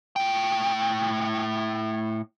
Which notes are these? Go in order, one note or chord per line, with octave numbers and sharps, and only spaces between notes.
A2 G5